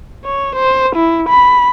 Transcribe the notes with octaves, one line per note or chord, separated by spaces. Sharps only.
C#5
C5
E4
B5